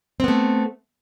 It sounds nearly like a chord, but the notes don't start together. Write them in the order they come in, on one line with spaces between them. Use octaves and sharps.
C4 B3 A3